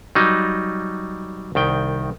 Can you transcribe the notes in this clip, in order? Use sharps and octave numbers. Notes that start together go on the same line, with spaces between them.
F#3 G3 D#4
C2 D#3 G5